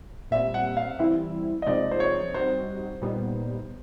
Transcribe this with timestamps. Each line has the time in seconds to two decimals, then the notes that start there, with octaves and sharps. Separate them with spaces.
0.31 A#2 G3 C4 E5
0.54 F#5
0.77 F5
0.99 E3 G3 C4 E4 E5
1.62 D#5
1.66 C3 F3 G#3 C4 D#4 D5
1.91 C5
2.00 C#5
2.34 G3 C4 D#4 F#4 C5
3.01 A#2 G3 B3 D#4